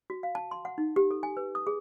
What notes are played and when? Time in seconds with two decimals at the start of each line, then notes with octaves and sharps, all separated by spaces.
0.10 F#4
0.23 F5
0.35 A5
0.51 C6
0.65 F#5
0.78 D#4
0.96 G4
1.11 A4
1.23 G#5
1.37 B4
1.55 D#6
1.67 G#4